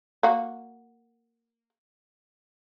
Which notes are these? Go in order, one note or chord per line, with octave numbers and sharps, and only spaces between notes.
A#3 F#4